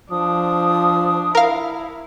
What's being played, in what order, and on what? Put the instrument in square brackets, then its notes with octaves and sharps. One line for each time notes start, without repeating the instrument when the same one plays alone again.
[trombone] F3 [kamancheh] D4 [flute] D#6
[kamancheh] E4 [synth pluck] A#4 F5